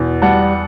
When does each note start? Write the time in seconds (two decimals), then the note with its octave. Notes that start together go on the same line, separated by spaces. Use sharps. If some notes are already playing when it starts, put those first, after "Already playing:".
Already playing: E2 B2
0.22 G3 F#5 A5